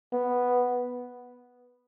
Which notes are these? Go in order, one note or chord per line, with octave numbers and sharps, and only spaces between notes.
B3